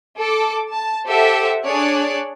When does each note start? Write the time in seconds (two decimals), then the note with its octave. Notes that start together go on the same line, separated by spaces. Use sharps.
0.20 A4 D6
0.72 A5
1.09 G4 A4 C5 E5 F#5
1.65 D4 G#4 C#5 D5 F#6